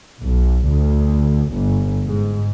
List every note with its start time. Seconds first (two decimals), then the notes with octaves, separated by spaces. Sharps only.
0.21 B1
0.70 D2
1.53 G1
2.07 G#2